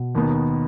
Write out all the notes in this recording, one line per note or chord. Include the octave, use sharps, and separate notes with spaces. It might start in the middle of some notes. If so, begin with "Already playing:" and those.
Already playing: B2
D#2 D#3 B3 D#4